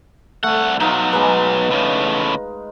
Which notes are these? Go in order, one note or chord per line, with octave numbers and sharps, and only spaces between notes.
C2 A3 F#5
B2 F#3 D#4 F4
G#3 B4
A2 C#3